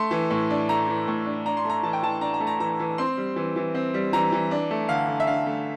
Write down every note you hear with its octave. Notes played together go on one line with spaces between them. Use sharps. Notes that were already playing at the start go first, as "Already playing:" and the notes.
Already playing: A3 C6
E3
A2
D4
A3 A#5
E3
A2
D4
D4 A#5
C6
A3
A#5
E3 A5
G5
E3 A5
D4 A#5
A#5
A3
A#5
E3 A#5
E3
C4 C6
G3
E3
E3
C4
G3
E3 A#5
E3
D4
A3
D3 F5
D3
E5
D4 F5
A3